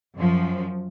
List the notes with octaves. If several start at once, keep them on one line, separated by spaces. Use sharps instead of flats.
F#2 F3